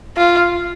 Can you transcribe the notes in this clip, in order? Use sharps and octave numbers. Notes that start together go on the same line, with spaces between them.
F4